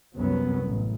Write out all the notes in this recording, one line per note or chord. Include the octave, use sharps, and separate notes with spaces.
C2 F#2 F#3 B3
A1